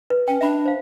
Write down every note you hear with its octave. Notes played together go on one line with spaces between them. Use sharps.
B4
C#4 G5
D4 E5 B5
C5 F5